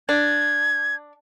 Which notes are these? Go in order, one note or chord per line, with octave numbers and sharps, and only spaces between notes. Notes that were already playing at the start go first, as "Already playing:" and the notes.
D4 G#6